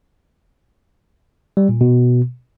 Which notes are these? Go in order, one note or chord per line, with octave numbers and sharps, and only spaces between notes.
G3
A#2
B2